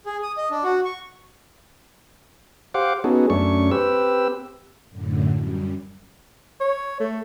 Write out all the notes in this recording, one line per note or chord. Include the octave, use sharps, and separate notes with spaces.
G#4
D#6
D#5
D4
F#4
C#6
G4 C5 F5 F#5 D6
B3 C#4 D#4 F#4 G#4 A4
F#2 A3 C#4 D4 C#6
C4 G4 B4 E6
F#2 A2 D3
F#2 G3
C#5
A3